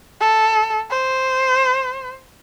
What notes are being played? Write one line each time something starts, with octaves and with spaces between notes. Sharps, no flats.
A4
C5